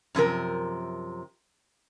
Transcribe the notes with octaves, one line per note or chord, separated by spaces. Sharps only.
F#2 C3 F3 A#4